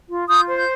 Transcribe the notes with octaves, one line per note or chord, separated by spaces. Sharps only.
F4
F4 D#6 G6
C5
G6